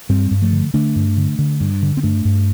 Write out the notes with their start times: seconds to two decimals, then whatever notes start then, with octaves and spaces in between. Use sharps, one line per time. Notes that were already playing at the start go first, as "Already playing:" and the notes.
0.09 G2 G3 C4
0.31 G2
0.42 F3 A3
0.53 D3
0.74 D3 A3 D4
0.96 G2
1.17 D3
1.39 D3
1.60 G2
1.82 D3
1.97 C4
2.03 G2 A3 D4
2.25 G2